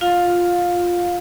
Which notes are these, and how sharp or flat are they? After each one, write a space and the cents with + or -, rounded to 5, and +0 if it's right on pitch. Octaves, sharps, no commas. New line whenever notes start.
F4 +5 F5 +20